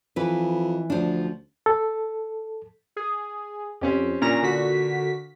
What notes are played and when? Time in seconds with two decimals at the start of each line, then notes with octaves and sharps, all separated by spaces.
0.16 F2 E3 B4
0.90 D2 F3 D4
1.66 A4
2.96 G#4
3.81 F2 C4 C#4 G4
4.21 A#2 C#4 D4 A#5 A#6
4.43 D3 F#4 B6